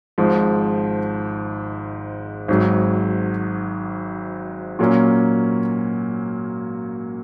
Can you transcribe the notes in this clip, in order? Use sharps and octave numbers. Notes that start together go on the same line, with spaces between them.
G#1 G#2 F3
G#1 G#2 F#3
A#2 F#3 A#3 C#4